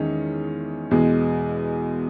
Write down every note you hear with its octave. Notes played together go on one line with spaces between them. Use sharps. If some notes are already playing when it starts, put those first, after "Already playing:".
Already playing: E2 D#3 G#3 C#4
E2 B2 G#3